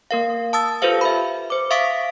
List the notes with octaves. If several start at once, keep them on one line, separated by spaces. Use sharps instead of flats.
A#3 A#4 F5
A5 D#6 E6 A6
F4 G4 A4 B4 C5 F5
E5 B5
C5 D6
E5 F5 C#6 D#6 B6 D7